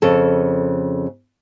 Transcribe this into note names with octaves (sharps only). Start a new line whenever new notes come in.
F2 C#3 A4